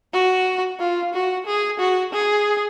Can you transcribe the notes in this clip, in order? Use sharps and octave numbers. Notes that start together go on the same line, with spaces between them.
F#4
F4
F#4
G#4
F#4
G#4